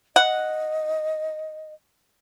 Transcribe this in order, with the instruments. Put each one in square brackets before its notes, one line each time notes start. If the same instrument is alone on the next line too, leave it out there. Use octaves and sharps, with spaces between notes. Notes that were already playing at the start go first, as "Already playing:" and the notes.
[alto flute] D#5 [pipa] F#5